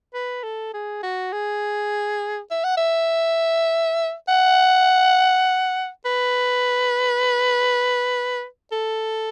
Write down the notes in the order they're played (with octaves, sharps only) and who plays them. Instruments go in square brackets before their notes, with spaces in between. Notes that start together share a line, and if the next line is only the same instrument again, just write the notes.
[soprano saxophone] B4
A4
G#4
F#4
G#4
E5
F#5
E5
F#5
B4
A4